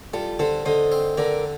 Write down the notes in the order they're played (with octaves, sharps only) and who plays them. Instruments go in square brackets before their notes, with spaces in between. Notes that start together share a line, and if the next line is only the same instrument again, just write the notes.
[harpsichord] G3 [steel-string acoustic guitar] F4 A4
[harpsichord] D3 [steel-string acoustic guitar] A4 C5
[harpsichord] D3 [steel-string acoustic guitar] C5 D#5
[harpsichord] C4
[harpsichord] D3 [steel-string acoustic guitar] A#4 D5